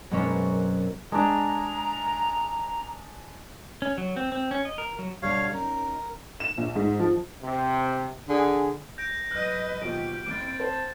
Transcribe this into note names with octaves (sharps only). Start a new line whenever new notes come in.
F#2 B2 G#3 A#3 C4 C#4
G#3 D4 A#5
C#4
F#3
C4
C4
C#4
D#5
A#4
F#3
B2 D3 G3 C#5 F5
C#4 D#4 A#4
E7
A#1
G#2
F3
C3
D3 G#4
G6 A#6 D7
F#3 B4 D#5 F6 F#6
D#2 B2 F3 G4 D7
F#1 C4 D6 G6 A6
C5 A5